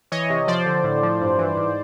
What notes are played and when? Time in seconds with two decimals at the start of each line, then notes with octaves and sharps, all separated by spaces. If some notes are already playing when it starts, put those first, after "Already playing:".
0.12 E3 C#5 D#5
0.30 C3
0.47 F3 C5 D5
0.66 D3
0.84 A2
1.03 F3
1.21 G2
1.39 E3
1.57 G#2